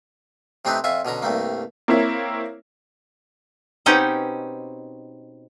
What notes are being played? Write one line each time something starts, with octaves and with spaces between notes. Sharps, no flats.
C3 A3 C4 D4 D#4 B4
F2 F4 E5 G#5 C#6
B2 D3 C#4 A#5
C2 G2 A3 A#3
A#3 C4 E4 A#4 C#5 E5
B2 C4 C#4 D#4 G4 C5